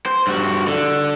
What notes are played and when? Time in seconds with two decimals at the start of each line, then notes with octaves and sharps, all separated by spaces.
0.06 C5
0.27 G2 F#4
0.67 D3